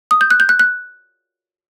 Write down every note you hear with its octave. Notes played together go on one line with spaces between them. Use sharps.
D#6
G6
F#6
G6
F#6
F#6